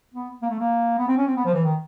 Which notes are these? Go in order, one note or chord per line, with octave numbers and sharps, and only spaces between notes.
B3
A#3
A3
A#3
B3
C4
C#4
C4
B3
F3
E3
D#3